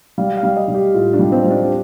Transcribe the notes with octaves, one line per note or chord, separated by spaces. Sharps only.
G3 F5
F5
G3
D#5
G3
G4
A2 F4
D4
G3
C4
G3
D4
G4